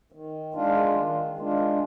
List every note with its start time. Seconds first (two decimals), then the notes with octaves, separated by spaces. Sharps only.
0.12 D#3
0.54 G#3 D4 F4
0.96 D#3
1.38 G#3 D4 F4